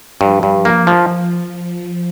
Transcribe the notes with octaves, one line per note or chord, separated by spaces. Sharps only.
G2 F3
G2
F3
A#3
F3